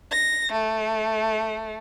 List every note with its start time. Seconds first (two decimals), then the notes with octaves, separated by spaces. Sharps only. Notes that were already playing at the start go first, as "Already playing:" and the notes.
0.11 A#6
0.52 A3